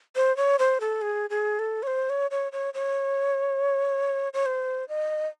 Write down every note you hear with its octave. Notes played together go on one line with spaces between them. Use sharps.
C5
C#5
C5
A4
G#4
G#4
A4
C#5
C5
C#5
C#5
C#5
C#5
C#5
C5
D#5